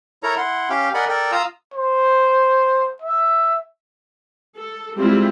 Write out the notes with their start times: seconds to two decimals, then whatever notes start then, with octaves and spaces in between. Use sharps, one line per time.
0.23 E4 A4 A#4 C#5 A#5
0.37 E4 F#5 C6
0.70 C#4 G4 F5 G5
0.94 A#4 D5 D#5 F#5 G#5 B5
1.09 A4 A#4 D5 G5
1.32 F4 F5 A#5 D#6 E6
1.74 C5
3.02 E5
4.57 A4
4.98 G3 G#3 C4 E4 F4 G4